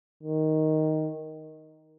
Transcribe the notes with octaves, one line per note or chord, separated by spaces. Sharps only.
D#3